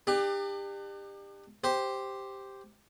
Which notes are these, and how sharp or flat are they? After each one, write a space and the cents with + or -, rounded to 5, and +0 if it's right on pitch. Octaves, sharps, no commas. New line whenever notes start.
D4 +40 G4 +25
G4 +0 C5 +0